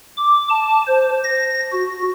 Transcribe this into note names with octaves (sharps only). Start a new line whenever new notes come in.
D6
A5
C5
A#6
F#4